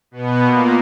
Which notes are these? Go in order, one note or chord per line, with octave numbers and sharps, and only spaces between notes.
B2 B3
A#2 A#3